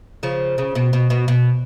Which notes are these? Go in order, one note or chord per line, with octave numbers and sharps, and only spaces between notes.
C#3 F3
C#3
B2
B2
B2
B2